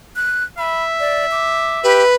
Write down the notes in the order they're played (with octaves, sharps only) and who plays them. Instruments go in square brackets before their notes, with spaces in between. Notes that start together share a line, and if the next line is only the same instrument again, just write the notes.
[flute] F#6
[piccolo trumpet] E5 [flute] B5
[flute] D5
D6
[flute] G4 [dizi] B4